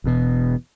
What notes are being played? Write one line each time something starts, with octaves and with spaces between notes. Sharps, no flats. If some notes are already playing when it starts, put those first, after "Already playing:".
E1 E2 B2